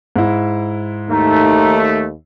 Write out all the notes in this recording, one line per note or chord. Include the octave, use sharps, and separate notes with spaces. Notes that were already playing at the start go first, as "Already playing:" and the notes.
G#2 E4
D#2 A3 D#4